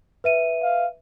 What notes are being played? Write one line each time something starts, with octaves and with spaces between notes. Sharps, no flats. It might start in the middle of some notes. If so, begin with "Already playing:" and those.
B4 E5 D#7
F5